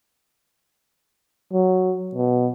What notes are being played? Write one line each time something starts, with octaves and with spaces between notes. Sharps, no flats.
F#3
B2